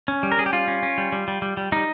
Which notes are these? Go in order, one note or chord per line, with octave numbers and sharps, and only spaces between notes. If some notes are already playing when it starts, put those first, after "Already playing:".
C#4
G3
A#4
C#4 G#4
G4
G3 F4
C#4
C#4
G3
G3
G3
G3
G3
G3 D#4